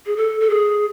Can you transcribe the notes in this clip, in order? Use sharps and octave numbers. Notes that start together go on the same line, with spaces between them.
G#4
A4
A4
G#4